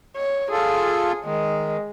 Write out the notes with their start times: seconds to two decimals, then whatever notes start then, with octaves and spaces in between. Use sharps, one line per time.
0.16 C#5
0.51 F4 G#4 A4
1.25 D#3 G#3